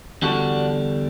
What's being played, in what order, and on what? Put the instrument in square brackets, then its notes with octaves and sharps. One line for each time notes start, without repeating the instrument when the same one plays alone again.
[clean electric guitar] E2 D3 G3 D4 F#4